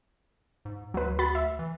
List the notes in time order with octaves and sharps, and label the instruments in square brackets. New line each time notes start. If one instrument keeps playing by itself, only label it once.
[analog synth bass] G#2
[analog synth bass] D2 [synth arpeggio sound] F#3 B4
[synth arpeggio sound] F#4 B5 A6
E5
[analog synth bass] E3